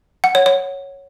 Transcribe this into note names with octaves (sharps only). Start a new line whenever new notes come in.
F#5
C#5
C#5